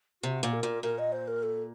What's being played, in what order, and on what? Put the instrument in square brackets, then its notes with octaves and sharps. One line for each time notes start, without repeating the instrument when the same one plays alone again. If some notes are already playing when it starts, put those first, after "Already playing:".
[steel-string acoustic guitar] C3 [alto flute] F#4
[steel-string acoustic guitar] A#2
[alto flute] A#4
[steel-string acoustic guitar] A#2
[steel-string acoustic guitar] A#2 [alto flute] A#4
[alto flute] D#5
C5
A#4
A4